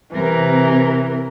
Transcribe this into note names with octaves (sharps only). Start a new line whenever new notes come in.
C3 E3 A#4